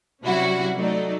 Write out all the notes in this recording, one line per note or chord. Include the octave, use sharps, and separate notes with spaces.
C3 F#3 G3 C#4 E4 F#4
F#3 A3 D#4 D5